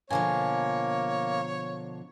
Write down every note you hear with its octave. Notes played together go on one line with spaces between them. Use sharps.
B2 D3 F3 A#3 C#5 G#5